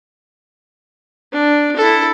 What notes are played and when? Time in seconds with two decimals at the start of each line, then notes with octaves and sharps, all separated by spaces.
1.33 D4
1.76 E4 A4